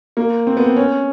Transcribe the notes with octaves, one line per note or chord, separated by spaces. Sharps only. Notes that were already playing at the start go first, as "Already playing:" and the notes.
A#3
C4
B3
C4
C#4